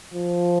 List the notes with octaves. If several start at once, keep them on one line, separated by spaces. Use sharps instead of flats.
F3